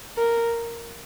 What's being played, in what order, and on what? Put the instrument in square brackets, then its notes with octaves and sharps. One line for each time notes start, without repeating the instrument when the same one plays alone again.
[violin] A#4